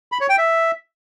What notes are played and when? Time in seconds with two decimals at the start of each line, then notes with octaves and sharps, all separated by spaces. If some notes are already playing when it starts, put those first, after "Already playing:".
0.12 B5
0.21 C#5
0.29 G5
0.38 E5